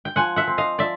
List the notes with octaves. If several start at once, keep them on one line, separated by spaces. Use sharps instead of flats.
G5
F3 F#5 G#5
E5 F#5
C4
D#5 F5
F3 D5 E5